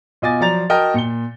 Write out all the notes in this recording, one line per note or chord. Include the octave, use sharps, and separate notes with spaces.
B2 F4 D#5 G#5 D6 A6
F3 F#3 D5 A#5 A6 F7
F#4 A#4 D#5 G5 A5 F6
A#2 C#7 G7